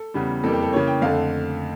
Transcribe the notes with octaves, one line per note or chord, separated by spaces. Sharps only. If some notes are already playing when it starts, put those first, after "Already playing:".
Already playing: A4
E2 C#3 G3
F2 E3 G3 A#3 A4
G4
A4
C#3 E3 A#3 C#5
G5
F2 D3 A3 F5